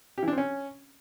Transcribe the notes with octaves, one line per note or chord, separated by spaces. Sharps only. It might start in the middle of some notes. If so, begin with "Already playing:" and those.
G4
E3
D4
C4
C#4